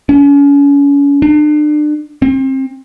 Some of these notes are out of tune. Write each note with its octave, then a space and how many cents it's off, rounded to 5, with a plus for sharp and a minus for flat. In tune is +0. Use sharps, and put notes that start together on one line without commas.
C#4 +35
D4 +35
C4 +30